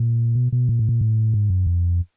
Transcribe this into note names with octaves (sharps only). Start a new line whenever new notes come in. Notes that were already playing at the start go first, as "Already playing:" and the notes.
Already playing: A#2
B2
B2
A#2
A2
A#2
A2
G#2
F#2
F2